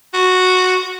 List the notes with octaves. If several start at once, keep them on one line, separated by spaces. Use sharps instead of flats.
F#4